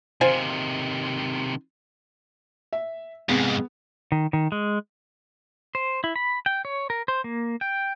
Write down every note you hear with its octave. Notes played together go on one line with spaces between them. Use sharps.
C3 D#3 F4 C5 G#5
E5
F2 G#2 C3 G#3 B3
D#3
D#3
G#3
C5
E4
B5
G5
C#5
A#4
C5
A#3
G5